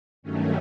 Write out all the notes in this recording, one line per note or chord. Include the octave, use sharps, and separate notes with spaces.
G2 D#3 F#3 A3 C#4